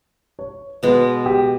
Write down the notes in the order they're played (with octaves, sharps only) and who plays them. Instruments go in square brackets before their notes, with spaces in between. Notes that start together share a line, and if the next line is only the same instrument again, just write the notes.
[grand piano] C#5
[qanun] B2 G#3 B3 [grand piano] B4
[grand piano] G4